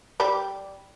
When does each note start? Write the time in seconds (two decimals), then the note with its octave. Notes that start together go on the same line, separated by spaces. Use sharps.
0.20 G3 G4 D5